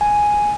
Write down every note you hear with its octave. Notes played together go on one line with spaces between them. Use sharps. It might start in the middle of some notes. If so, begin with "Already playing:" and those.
G#5